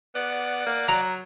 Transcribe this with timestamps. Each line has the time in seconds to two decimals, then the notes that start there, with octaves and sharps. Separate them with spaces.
0.15 B3 D5 F#5
0.66 A#3
0.88 F#3 A#5